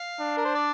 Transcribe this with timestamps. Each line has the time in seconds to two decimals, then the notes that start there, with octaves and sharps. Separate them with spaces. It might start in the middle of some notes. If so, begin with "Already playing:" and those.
Already playing: F5
0.20 D4
0.37 A#4
0.45 C5
0.54 D5